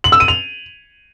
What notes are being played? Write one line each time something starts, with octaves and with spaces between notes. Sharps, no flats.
F#7
E6
D#7
F7